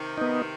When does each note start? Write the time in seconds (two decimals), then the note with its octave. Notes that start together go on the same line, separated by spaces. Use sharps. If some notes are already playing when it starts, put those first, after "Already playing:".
Already playing: C3 D#3
0.18 B3 D#4